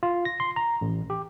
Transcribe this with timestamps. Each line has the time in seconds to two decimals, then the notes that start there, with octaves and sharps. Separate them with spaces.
0.03 F4
0.25 A#6
0.40 C6
0.56 A#5
0.81 A1
1.10 G4